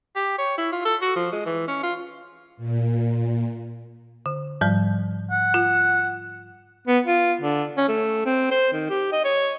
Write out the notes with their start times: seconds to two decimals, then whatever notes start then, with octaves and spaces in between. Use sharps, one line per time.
0.16 G4
0.38 C#5
0.58 E4
0.72 F4
0.85 A4
1.01 F#4
1.16 F3
1.32 G#3
1.46 E3
1.68 C#4
1.83 F4
2.57 A#2
4.26 D3
4.61 G#2 F3 G3
5.31 F#5
5.54 F4
6.87 B3
7.06 F4
7.41 D3
7.77 C#4
7.88 A3
8.25 C4
8.51 C5
8.73 D#3
8.90 G4
9.12 D#5
9.24 C#5